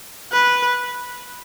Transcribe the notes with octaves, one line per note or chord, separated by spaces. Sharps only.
B4